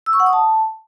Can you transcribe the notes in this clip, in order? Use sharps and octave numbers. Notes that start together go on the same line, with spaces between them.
E6
C#6
F#5
D#6
A5